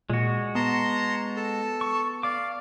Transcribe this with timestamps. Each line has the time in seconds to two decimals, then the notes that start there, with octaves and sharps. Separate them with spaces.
0.10 A#2 G#3 F#4
0.55 B3 A5 A#5 C6
1.36 A4 A5
1.81 C#6
2.23 D5 F5 D6